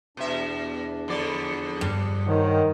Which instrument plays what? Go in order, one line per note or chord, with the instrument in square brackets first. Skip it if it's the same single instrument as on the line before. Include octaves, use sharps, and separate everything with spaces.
[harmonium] E2 D4 [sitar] B2 E5
[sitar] F2 D3 D5
[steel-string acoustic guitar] G2
[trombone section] D#3 [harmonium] C5 C#5 F#5